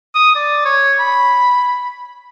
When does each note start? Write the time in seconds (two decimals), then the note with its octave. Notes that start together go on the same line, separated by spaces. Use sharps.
0.15 D#6
0.35 D5
0.65 C#5
1.00 B5